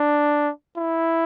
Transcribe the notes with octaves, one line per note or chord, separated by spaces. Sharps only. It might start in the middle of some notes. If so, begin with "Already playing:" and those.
Already playing: D4
E4